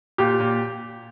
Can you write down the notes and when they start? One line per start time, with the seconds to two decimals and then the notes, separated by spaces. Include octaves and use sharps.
0.18 A#2 G4
0.40 A#2